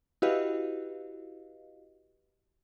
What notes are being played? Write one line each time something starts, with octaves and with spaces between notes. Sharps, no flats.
E4 F#4 G4 B4 D#5 F5